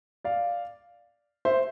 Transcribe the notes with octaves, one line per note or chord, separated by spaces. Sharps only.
D5 F5
C5 E5